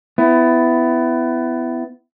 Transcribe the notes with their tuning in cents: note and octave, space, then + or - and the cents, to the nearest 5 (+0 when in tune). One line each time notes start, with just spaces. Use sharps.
B3 +25 E4 +10